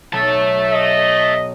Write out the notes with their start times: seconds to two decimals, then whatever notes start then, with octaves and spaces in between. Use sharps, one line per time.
0.13 B1 E5 A5
0.71 D#5